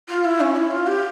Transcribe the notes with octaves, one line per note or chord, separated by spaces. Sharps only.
F4
E4
C#4
E4
F4
G4